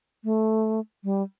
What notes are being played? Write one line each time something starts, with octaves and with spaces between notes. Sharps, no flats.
A3
G3